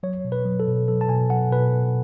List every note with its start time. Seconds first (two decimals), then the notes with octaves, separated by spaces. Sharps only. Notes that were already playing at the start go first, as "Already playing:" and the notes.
0.03 F#3 C#5
0.25 B2
0.32 B4
0.45 F#3
0.60 A4
0.68 B2
0.88 F#3 A4
1.01 A5
1.09 B2 G#5
1.30 F#3 F#5
1.52 B2 B4